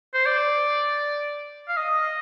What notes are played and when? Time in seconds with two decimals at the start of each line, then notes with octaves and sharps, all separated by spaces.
0.14 C5
0.26 D5
1.68 F5
1.77 D#5